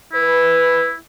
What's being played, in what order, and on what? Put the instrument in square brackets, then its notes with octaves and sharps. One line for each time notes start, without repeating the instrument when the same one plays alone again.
[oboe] E4 [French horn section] B4